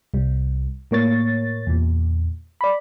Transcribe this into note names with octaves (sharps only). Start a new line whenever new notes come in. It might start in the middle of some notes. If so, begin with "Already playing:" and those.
C2 G3
A2 A#3 C#5 A6
E2 A#2
D5 B5